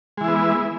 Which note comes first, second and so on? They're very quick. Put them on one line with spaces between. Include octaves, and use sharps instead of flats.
G#3 E3 E4 B3